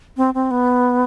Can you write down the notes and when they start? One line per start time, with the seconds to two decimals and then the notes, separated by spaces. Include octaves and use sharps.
0.17 C4
0.34 C4
0.51 B3